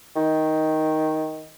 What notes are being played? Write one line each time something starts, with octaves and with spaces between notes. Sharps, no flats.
D#3